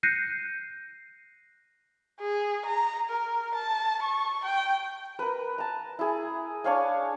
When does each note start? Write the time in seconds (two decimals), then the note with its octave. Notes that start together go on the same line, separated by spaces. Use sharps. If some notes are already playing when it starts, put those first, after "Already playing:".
0.03 F#6 G6 A#6 C7 C#7 D#7
2.20 G#4
2.66 A#5
3.10 A#4
3.55 A5
4.02 C#6
4.45 G5
5.19 A#4 B4
5.58 A5 A#5
5.99 E4 G#4
6.64 D4 C#5 F5 G#5